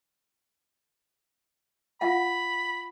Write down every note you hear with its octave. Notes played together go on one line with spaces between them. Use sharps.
F4 F5 F#5 B5